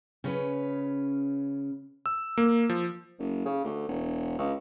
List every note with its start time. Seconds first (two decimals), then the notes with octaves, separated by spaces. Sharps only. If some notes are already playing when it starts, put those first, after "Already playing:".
0.24 C#3 C#4 B4
2.06 E6
2.38 A#3
2.69 F3
3.19 F#1
3.45 C#3
3.64 D2
3.88 E1
4.38 C#2